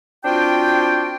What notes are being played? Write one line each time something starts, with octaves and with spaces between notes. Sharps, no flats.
C4 D4 F4 F#4 G5